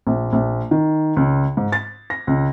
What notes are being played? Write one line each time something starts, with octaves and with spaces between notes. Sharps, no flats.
A#1
A#1
D#3
C#2
G#2
A6
A#6
C#2